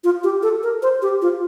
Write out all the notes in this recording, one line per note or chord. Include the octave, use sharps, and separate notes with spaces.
F4
G4
A4
A#4
C5
G4
F4